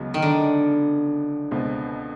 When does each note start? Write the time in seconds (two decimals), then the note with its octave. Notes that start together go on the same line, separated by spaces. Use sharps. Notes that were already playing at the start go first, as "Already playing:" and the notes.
Already playing: C#2 C#3 F#3 B3 D#4
0.14 D#3
0.22 D3
1.51 C#2 B2 G#3 C4